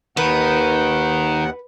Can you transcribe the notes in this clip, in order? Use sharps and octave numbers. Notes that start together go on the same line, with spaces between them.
D#2 D#3 B4 F#5